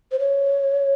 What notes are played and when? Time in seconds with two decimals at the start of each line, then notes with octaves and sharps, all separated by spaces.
0.12 C5
0.19 C#5